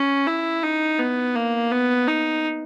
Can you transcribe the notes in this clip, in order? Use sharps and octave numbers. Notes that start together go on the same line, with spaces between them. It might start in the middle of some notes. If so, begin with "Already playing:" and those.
Already playing: C#4
E4
D#4
B3
A#3
B3
D#4